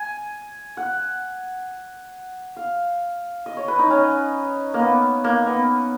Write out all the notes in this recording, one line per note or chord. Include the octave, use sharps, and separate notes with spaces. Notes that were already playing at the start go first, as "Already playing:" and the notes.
Already playing: G#5
F#5
F5
D#5
C#5
B4
D#4
C#4
A#3
B3
A#3
B3